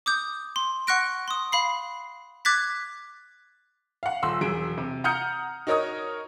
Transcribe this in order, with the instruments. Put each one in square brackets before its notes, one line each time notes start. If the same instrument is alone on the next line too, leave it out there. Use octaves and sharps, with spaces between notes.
[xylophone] D6 D#6 G6
C6
F#5 C#6 F6 F#6 A#6 D7
C6 D#6
F5 B5 C7
D6 F#6 G#6 A6 B6
[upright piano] F5 F#5
D#1 C6 E6
E1 F#3 G#4 D7
C3
F#5 A#5 D#6 F6 G6 C#7
D#4 F#4 A#4 C#5 D#5 D#6